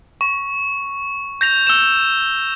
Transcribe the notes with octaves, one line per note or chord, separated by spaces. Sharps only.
C#6
G6 A#6 F7
E6 E7